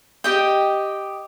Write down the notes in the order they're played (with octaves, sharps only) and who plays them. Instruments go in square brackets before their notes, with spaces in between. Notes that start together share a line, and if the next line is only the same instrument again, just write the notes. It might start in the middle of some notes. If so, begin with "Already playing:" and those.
[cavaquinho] G4 D#5 G5